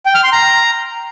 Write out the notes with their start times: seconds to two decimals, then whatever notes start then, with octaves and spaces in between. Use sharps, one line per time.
0.06 G5
0.15 F6
0.23 C6
0.32 A#5